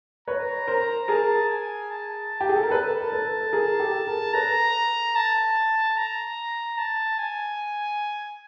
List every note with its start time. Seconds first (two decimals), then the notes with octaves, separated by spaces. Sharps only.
0.27 B4 C#5 A#5
0.67 A#4 C5
1.08 G#4 A#4 A5
1.49 G#5
1.90 A5
2.41 G4
2.49 G#4
2.56 A4
2.63 A#4
2.71 A4 B4
3.00 A#4
3.12 A4 B4
3.40 A4
3.52 G#4 A#4
3.80 G4 A4
4.07 G#4 A#4
4.34 A4 B4 A#5
5.15 A5
5.97 A#5
6.78 A5
7.19 G#5